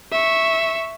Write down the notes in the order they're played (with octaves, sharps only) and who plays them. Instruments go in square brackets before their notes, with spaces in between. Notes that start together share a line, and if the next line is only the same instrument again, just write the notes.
[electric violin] E5 C#6